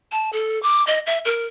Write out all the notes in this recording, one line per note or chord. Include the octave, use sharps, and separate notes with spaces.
A5
A4
D6
D#5
E5
A#4